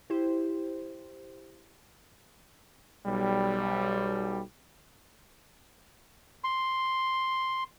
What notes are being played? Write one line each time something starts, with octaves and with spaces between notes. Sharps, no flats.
E4 G4 C5
B1 G3
C6